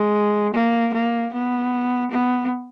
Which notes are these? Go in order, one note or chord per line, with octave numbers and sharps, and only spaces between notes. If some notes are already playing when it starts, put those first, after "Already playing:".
Already playing: G#3
A#3
A#3
B3
B3